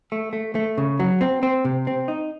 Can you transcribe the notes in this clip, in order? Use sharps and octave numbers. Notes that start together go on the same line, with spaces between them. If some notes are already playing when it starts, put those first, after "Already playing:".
A3
A3
A3
C#3
F#3
C4
C4
C3
C4
D#4